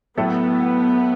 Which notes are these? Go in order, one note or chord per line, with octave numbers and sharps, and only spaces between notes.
A2 F#3 A3 B3 E4 A4